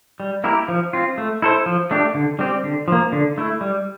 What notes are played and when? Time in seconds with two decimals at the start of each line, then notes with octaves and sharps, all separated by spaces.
0.20 G3
0.44 A#3 E4 G4 A#4
0.68 F3
0.93 C4 F4
1.18 A3
1.42 E4 A4 C5
1.66 F3
1.91 A3 D4 G4
2.14 D3
2.39 G3 C4 G4
2.64 D3
2.88 F3 A#3
3.12 D3
3.38 A3 E4
3.61 G3